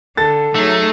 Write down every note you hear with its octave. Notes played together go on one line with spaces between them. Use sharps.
D3 A4 A6
F#3 A3 D#4 G#4